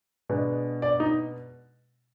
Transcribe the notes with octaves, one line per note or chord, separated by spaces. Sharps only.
B2 G#3 B3 D4
D5
D#4